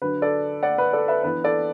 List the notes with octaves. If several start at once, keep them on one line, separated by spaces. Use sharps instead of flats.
D3 F#3 D4 B4
A4 D5
D5 F#5
B4
A4 D5
B4 E5
E3 B3 D4 B4
A4 D5